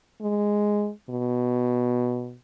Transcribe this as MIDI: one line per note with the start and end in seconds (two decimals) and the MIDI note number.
0.22 0.90 56
1.10 2.36 47